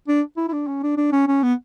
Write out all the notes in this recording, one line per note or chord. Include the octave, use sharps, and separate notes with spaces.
D4
E4
E4
D4
C#4
D4
D4
C#4
C#4
B3